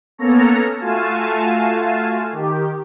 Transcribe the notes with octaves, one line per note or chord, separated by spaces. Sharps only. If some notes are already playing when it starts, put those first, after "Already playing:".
A#3 B3 C#4 A4 C#5 A#5
A3 F4 F#4 F5 G#5 A5
D#3 G4